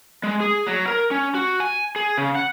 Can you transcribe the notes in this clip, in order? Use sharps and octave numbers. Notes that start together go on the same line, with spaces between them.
G#3
G#4
F#3
A#4
C#4
F#4
G#5
G#4
C#3
F#5